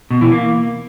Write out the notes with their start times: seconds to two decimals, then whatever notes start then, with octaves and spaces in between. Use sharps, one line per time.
0.11 B2
0.21 E3
0.32 A#3